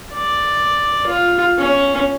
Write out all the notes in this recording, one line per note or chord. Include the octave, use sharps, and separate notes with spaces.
D5
F4
C#4